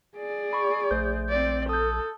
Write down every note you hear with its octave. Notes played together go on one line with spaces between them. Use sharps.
G#4 D5
B5 C#6
A#1 A3 C5 G6
C4 D5
A4 D#6 G6